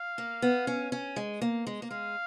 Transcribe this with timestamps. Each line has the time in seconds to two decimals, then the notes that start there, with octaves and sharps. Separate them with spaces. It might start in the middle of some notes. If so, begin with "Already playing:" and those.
Already playing: F5
0.18 A#3
0.42 B3
0.67 C#4
0.92 C#4
1.16 G#3
1.42 A#3
1.67 G#3
1.82 A#3
1.91 G#3 F5